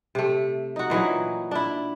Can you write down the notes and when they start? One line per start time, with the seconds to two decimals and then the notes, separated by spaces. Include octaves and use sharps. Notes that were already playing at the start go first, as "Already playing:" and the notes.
0.15 C3 A3
0.76 D#4 F#4
0.90 A#2 E3 F#3 D#4
1.51 D4 E4